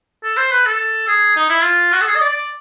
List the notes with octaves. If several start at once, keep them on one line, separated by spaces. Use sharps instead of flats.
A4
C5
B4
A4
G#4
D#4
E4
F4
F#4
A4
G#4
D#5
D5